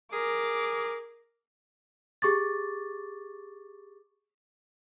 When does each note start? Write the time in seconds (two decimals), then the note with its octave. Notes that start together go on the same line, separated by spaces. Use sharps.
0.13 G#4 A#4 D6
2.22 G4 G#4 C#6 D6 A6